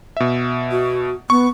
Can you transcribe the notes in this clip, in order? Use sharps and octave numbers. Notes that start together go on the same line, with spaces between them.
B2 E5
F#4
B3 C#6